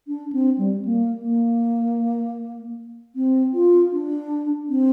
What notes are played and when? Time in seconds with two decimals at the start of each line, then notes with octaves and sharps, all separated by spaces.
0.08 D4
0.32 C4
0.58 G3
0.85 A#3
1.22 A#3
3.16 C4
3.54 F4
3.92 D4
4.70 C4